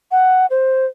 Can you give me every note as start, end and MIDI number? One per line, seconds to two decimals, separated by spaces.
0.11 0.46 78
0.50 0.86 72